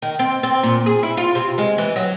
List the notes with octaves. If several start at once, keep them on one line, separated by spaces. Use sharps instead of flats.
D#3
C4
C4
A#2
G#4
E4
F4
C3
G#3
E3
F#3